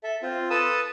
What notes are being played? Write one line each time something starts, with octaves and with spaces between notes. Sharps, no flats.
A4 E5
C4 F4
A4 B4 A5 D#6 E6